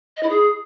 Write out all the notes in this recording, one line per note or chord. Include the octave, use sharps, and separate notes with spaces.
D#5
E4
G#4